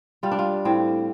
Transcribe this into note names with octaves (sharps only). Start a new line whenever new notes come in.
G3 F4
D4
F4
A2 C4